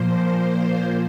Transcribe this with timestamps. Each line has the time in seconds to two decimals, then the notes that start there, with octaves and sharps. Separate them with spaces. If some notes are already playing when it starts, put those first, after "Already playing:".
Already playing: A#2 F3 A#3 C5